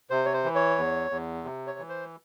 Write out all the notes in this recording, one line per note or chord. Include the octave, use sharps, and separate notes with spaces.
C3 C5
C#5
C5
E3
C#5
E2
E2
C3
C#5
E3
C5